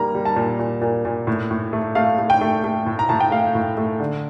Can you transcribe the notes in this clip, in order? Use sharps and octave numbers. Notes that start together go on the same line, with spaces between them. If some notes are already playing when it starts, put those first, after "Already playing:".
Already playing: G3 A#3 A#5
G3
A5
A#2
A#2
A#2
A#2
A2
A2
A3
A3 F5
A3
G5
A3
A3
A2
A#5
A2 A5
G5
A3 F5
A2
A3
D3